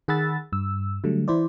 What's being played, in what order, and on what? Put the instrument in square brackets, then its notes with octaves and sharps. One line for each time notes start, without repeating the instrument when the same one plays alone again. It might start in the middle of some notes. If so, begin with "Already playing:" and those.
[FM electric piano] D#3 G#4 F#5 B5 E6 A6
G2 E6
D3 F#3 G3 A3
E3 E4 C5 D5